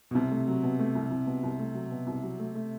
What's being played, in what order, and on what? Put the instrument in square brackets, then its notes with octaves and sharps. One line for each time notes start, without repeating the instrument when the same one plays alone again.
[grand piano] B2
[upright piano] C2 [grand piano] C3
[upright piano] A3
F#3
B2
A3
C2
C2
B2
C2
A3
F#3
B2
C2
F#3
A3
A3